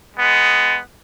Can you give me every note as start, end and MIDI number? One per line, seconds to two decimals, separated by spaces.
0.17 0.78 56
0.17 0.78 59